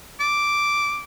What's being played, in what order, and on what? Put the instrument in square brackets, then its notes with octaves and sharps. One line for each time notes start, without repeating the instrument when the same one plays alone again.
[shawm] D6